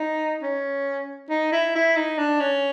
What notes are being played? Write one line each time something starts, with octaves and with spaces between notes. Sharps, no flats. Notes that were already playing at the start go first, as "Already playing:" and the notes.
Already playing: D#4
C#4
D#4
E4
E4
D#4
D4
C#4